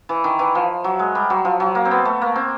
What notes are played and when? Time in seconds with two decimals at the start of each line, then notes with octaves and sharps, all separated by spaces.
0.09 E3
0.24 D#3
0.39 E3
0.55 F3
0.84 F#3
0.99 G#3
1.15 G3
1.30 F#3
1.45 F3
1.60 F#3
1.75 A#3
1.85 C4
1.91 B3
2.05 A3
2.21 A#3
2.36 C4